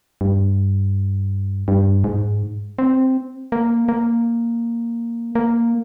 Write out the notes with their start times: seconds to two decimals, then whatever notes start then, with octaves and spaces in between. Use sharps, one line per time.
0.21 G2
1.68 G2
2.04 G#2
2.79 C4
3.52 A#3
3.89 A#3
5.35 A#3